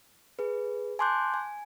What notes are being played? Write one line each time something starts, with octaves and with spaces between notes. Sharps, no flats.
G#4 B4
G#5 A5 C6 D6 F#6 G6
G#5